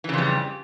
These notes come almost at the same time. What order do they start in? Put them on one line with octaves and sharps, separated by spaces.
E3 C#3 F2 G3